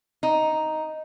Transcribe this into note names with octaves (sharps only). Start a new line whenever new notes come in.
D#4